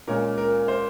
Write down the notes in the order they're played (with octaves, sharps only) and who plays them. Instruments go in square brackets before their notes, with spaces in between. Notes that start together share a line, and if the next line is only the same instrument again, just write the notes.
[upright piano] A#2 G#3 C#4 [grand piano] A#4
[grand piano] A#4
C5